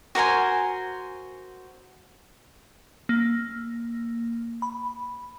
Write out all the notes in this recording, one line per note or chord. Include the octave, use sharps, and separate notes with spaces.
F#4 A#4 C5 G#5
A#3
B5